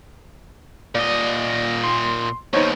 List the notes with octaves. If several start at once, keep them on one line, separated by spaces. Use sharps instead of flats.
A#2 D5 D#5
C6
D#2 B2 D#4 C5 C#5